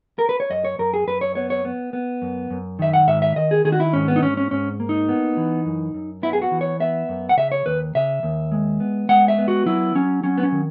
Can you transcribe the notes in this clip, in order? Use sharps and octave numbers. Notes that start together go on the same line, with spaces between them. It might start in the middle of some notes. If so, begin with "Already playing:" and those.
A#4
B4
C#5
F#2 D#5
C#5
F#2 A#4
G#4
F#2 B4
C#5
B3 C#5
C#5
B3
B3
F#2
F#2
D#3 E5
F#5
G#2 E5
E5
D#3 D#5
G#4
D#3 G#4
F#4
E4
G#2 C#4
B3
D#4
G#2 C#4
C#4
G#2 C#4
A#3
D#4
B3
E3
F#2
F#2
B3 E4
G#4
F#4
E3
C#5
B3 E5
F#2
F#5
C#3 E5
C#5
D#2 B4
C#3 E5
D#2
G#3
B3
G#3 F#5
E5
B3
F#4
F#3 E4
F#3 C#4
F#3 C#4
B3
C#4
D#3